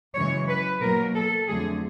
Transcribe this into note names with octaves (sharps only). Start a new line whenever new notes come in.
F#2 C#3 E3 G#3 C#5
B4
B2 F#3 A#3 A#4
A4
F2 D3 F#3 A3 G#4